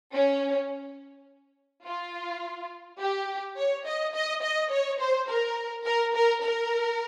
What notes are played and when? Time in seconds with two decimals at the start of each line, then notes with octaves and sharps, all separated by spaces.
0.13 C#4
1.84 F4
2.99 G4
3.56 C#5
3.86 D#5
4.13 D#5
4.42 D#5
4.71 C#5
5.00 C5
5.28 A#4
5.85 A#4
6.14 A#4
6.43 A#4